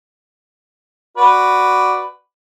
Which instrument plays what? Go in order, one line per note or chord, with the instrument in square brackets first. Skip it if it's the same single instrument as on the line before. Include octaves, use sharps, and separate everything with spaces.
[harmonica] F#4 B4 D5